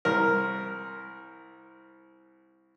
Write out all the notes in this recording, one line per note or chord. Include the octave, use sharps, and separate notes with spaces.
C2 A#4